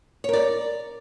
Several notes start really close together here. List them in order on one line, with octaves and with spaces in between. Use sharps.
C#5 A#4 D5